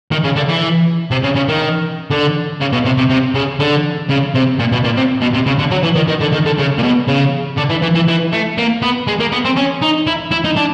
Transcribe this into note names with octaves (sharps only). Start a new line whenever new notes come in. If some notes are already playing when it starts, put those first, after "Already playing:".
D#3
C#3
D3
E3
C3
C#3
C#3
D#3
D3
C#3
B2
C3
C3
C3
C#3
D3
C#3
C3
A#2
B2
A#2
C3
B2
C3
C#3
D3
F#3
E3
D#3
D#3
D3
D#3
D3
C#3
A#2
B2
C#3
D3
E3
E3
E3
E3
A3
A#3
B3
G#3
A#3
B3
C4
C#4
D#4
E4
E4
D#4
D4